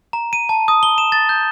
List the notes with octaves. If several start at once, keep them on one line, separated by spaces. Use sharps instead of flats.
A#5
D#7
A5
D#6
G7
E7
A6
G6